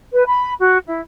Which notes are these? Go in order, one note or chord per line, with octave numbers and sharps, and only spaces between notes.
B4
B5
F#4
E4